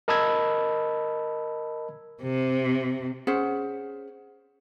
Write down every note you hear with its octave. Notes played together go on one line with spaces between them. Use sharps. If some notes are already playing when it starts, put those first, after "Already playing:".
A#4 D#5 A5 B5 E6 G#6
C3
C#4 G#4 C5 F#5